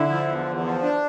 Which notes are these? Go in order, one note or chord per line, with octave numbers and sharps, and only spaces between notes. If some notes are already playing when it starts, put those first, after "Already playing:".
Already playing: D3 E4
F3
E2
E2
F3
D4